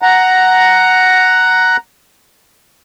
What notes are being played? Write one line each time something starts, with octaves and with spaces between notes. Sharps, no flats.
F#5 A#5